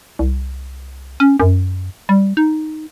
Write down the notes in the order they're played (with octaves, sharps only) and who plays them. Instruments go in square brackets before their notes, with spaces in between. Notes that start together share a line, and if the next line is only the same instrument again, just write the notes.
[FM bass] C2
C#4
F#2
G3
D#4